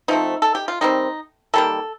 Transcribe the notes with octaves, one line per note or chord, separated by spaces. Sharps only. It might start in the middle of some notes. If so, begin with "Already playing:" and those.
F3 A3 C4 D#4
A4
G4
F4
D#3 G3 C4 D#4
D#3 G3 A#3 A4